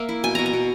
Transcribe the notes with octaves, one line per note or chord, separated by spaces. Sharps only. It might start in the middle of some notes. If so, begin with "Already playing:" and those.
Already playing: A#3 E5
E4
B2 G#5
B2 A#5
A#5
B2